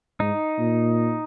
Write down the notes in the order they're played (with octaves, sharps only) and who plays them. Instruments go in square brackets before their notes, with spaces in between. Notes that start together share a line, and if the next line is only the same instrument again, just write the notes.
[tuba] G#2 [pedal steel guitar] D#4
[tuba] A#2